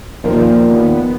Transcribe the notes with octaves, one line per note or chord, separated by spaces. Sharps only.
D#2 A#2 F3 A#4
D#2 B3